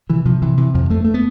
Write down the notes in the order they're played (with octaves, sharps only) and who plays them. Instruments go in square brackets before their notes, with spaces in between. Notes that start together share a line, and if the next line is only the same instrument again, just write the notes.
[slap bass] C3 E3
C3 F3
C3 E3
C3 E3
F2 F3
G2 A3
A3
B3